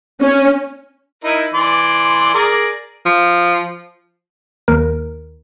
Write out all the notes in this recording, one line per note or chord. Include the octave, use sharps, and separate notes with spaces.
C#4
D#4 E4 A#4
E3 D5 C6
G#4 A#4 D5
F3
D#2 A#4